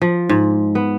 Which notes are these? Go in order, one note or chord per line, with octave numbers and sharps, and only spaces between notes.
F3
G#2
B3